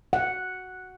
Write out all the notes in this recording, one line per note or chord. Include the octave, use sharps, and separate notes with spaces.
F#5